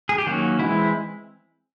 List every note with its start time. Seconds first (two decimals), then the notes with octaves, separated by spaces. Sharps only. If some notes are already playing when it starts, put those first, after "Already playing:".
0.09 G#4
0.18 G4
0.26 D#3 F#3 A#3 C#4 F#4
0.59 E3 G#3 C4 E4